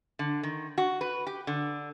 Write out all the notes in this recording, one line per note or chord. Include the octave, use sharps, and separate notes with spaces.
D3
D#3
F#4
B4
G4
D3